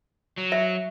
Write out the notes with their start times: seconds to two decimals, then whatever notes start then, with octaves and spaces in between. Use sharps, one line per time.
0.38 F#3
0.52 E5